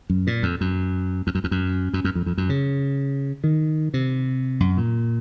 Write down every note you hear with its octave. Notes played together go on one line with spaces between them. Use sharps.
F#2
A#2
F2
F#2
F2
F#2
F2
F#2
F#2
F#2
F2
F2
F#2
C#3
D#3
C3
F#2
A#2